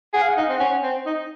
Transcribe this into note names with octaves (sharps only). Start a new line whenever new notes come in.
G#4 F#5
F5
F#5
D#4
C4
C#4
C4
D#4